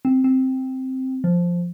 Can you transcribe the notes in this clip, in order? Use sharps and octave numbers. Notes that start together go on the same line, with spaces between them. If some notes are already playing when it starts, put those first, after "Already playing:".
C4
C4
F3